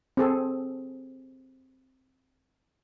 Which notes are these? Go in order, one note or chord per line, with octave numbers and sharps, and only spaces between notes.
C4 G#4 A4